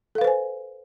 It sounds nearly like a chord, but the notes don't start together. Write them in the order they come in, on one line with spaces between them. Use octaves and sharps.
A4 F5 B4 C5 G#5